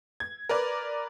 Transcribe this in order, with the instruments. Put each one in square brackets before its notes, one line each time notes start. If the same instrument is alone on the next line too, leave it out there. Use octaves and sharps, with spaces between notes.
[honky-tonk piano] G#6
A#4 B4 D5